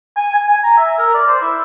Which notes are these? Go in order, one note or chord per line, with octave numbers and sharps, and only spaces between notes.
G#5
G#5
G#5
A#5
E5
A#4
D5
C5
E4